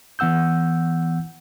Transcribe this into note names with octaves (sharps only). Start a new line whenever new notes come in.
E3 B3 F#5 E6 G6